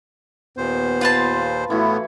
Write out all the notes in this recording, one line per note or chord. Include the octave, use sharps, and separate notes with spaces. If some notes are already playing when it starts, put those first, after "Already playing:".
D#2 A#2 B3 C5
F4 B4 A5
A2 E3 A3 B3 E4 F#4